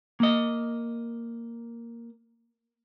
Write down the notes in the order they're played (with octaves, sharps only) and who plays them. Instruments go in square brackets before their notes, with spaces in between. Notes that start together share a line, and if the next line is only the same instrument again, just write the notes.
[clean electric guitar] A#3 D#5